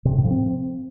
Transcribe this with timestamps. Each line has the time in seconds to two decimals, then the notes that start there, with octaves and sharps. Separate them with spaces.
0.05 C3
0.12 G2
0.18 A2
0.24 F3
0.31 C4